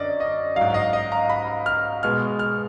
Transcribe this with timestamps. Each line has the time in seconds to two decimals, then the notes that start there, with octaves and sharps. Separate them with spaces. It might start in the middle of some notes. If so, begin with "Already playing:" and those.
Already playing: F#2 D3 D5 D#5
0.20 D#5
0.56 G#2 F#3 F5
0.74 D#5
0.93 D#5
1.12 A#5
1.29 B5
1.66 F6
2.03 B2 G#3 F6
2.39 F6